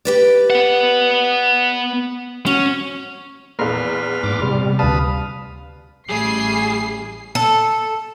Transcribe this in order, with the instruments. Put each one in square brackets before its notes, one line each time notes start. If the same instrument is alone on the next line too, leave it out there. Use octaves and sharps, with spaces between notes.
[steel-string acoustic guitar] G4 B4 D5
[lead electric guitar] B3 F#5
[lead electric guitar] C#4 [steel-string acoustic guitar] F#4
[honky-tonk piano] A#1 E2 [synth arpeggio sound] A#4 [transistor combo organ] B4 C6 F6
[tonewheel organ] G#2 D6
C3 G3
[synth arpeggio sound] D2 A5 [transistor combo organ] B4 F5 D#6
[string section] A1 C7 [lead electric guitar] G3 [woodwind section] A3 [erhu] G#4
[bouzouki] A4